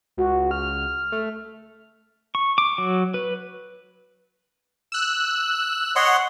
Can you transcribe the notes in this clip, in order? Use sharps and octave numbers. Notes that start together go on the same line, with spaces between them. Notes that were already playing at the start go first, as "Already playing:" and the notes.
C#2 F#4
F6
A3
C#6
D6
F#3
B4
E6 F#6
C#5 D#5 F#5 C6